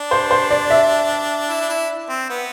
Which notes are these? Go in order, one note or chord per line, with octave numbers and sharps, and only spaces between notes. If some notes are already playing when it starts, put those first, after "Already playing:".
Already playing: D4
C5
C5
D5
E5
E4
D4
E4
C4
B3